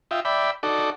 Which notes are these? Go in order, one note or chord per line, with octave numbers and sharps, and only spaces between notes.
F4 D#5 E5 G5
D5 E5 G5 B5
D#4 F#4 A4 D5